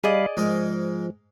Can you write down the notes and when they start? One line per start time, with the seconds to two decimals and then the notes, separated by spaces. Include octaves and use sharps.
0.04 G3 G#4 D5 D#5 F5 B5
0.37 G#2 F3 G#3 A#4